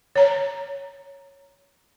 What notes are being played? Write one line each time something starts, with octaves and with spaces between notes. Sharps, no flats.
C#5 A#5